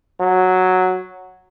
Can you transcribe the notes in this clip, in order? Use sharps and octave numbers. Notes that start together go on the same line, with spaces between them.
F#3